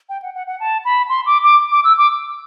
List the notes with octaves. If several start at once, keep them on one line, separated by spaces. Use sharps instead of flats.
G5
F#5
F#5
F#5
A5
B5
C6
D6
D6
D6
E6
D6